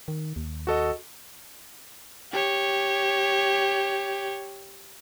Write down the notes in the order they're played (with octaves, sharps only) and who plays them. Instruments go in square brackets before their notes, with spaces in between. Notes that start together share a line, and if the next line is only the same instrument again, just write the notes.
[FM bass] D#3
D#2
[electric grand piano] F#4 A4 D#5
[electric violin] G4 C#5